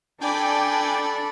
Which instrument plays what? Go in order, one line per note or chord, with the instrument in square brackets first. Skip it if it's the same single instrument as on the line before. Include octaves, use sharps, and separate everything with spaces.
[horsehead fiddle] D4 A4 [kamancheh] D5 B5 [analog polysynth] G5 G#5 D6